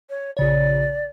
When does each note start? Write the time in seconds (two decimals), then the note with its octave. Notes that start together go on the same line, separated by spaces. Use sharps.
0.10 C#5
0.37 A#1 C#3 C#5 D5